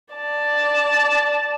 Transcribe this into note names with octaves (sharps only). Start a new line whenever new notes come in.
D5 A5